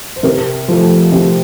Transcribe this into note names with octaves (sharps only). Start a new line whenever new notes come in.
C5
C3 A#4
F3 A3
C3